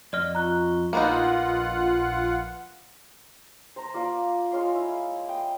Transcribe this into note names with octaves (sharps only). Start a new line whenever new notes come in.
F2 D5 D#5 F6
C4 F4 A#5 C#6 F#6
A#1 A#3 B3 D#4 F4 F#5
C5 A#5
A#3 F4 A#4 D5
G#3 F4 C#5 C6
E4
G5 D#6